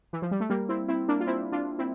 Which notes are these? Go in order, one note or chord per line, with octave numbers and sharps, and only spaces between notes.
E3
F3
G3
A3
G3 A#3
C4 E4
C4 E4
A#3 D4
F4
C4 E4
D4 F4
C4 E4